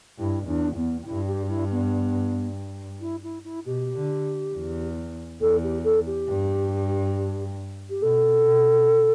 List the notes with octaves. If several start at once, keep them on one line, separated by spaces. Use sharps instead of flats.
G2 E4
E2 D4
E2 B3
G2 E4
G4
E4
B3
E4
E4
E4
B2 G4
D3
E2
E2 A4
G4
A4
G4
G2
G4
B2 A4
B2